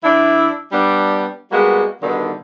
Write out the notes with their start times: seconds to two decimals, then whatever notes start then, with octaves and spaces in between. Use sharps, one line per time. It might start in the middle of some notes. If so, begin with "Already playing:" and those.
0.04 E3 D4 E4
0.72 G3 B3 D4
1.52 G3 G#3 A#3 B3 F#4
2.03 G2 B2 D3 D#3